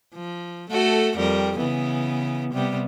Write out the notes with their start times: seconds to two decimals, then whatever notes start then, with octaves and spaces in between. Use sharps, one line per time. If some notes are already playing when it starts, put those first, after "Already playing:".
0.14 F3
0.70 A3 F#4 A4
1.17 F2 G3 A#4
1.56 C#3 E3 B3
2.53 C3 G3 B3